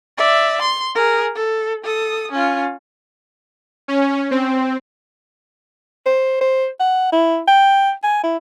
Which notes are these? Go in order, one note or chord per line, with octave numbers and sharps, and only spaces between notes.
D5 E5
C6
G#4 A#4
A4
A4 D#6
C#4 F4
C#4
C4
C5
C5
F#5
E4
G5
G#5
E4